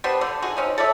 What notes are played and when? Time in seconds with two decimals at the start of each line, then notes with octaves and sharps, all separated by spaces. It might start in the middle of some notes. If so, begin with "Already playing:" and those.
0.04 G3 B3 D4 C5
0.21 D3
0.42 D#4 F#4 G#4
0.57 C4 C#4 D#4
0.78 A4 C#5 D5 E5